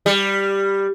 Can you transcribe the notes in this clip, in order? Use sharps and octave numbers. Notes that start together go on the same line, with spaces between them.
G3